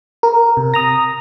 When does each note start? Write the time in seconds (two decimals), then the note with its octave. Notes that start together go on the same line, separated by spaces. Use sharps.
0.23 A#4 A#5
0.57 C3
0.74 A#5 D#6 A#6 F7